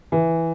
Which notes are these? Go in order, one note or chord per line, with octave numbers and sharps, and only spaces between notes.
E3